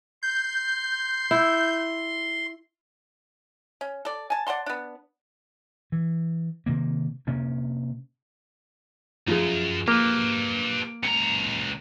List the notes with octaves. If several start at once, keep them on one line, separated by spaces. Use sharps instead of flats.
C6 G6
E4
C#4
A4 D5
G#5 A5
D5 F#5 A5 C6
B3 D4
E3
C3 D#3 A#3
C3 A#3 C#4 D4
F#2 F3 G#4
A#3 G4 B4
C#2 A#5 C#7